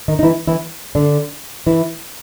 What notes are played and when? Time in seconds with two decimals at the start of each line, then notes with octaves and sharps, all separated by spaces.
0.08 D#3 D#4
0.19 D#4
0.23 E3 E4
0.48 E3 E4
0.95 D3 D4
1.67 E3 E4